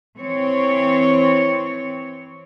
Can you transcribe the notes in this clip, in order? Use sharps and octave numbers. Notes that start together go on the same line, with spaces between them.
E3 C4 C#5